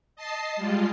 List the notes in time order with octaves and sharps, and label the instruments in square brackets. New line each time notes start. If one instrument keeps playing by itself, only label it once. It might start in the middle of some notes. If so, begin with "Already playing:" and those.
[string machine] D#5 A5 C7
G3 G#3 F4